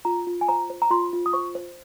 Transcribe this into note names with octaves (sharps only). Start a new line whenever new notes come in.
F4 A#5
F4
G#5
C5 A#5
C5
A#5
F4 C6
F4
D#6
C5 C#6
C5